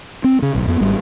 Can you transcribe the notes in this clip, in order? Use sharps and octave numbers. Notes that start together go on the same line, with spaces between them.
C4
C#3
D1 B1
F2 B3
G#1 G3